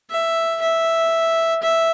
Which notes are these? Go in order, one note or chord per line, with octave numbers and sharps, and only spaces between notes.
E5
E5
E5